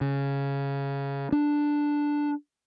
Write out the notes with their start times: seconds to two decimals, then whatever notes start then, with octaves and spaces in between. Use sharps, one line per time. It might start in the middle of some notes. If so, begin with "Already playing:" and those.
0.01 C#3
1.32 D4